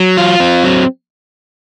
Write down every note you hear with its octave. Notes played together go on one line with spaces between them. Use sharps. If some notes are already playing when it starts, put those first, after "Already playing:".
Already playing: F#3
F4
C4
F#3